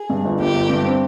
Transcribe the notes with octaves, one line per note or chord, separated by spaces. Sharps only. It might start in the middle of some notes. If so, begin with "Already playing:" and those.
Already playing: G#4
G2
G1
G1 G4
G1
G2
C4